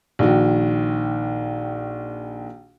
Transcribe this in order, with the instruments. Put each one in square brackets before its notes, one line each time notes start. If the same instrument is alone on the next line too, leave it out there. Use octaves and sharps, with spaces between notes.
[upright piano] A#1 D#3 F#4